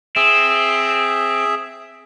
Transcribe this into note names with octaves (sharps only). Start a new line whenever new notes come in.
C4 G#4 E5